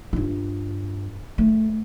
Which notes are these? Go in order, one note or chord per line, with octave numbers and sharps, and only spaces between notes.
G2 F4
A3